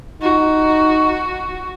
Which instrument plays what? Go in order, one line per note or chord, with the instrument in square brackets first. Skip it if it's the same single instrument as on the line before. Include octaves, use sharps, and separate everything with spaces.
[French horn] D#4 [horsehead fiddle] F#4